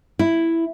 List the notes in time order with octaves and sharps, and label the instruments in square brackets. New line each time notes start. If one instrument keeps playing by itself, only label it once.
[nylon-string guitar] E4